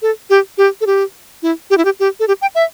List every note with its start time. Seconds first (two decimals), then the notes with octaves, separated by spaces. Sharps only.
0.02 A4
0.30 G4
0.58 G4
0.81 A4
0.87 G4
1.42 E4
1.70 G4
1.78 E4
1.85 G4
2.00 G4
2.20 A4
2.28 G4
2.42 G5
2.55 E5